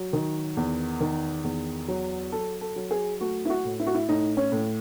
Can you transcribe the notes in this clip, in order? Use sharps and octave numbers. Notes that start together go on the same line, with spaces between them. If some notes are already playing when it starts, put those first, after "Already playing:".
Already playing: F#3
D#3
E2
D#3
E2
F#3
F#3 A4
A4
F#3
G#4
A3 F#4
E4
F#4
A2
E4
F#4
E4
A2 D#4
C#4
A2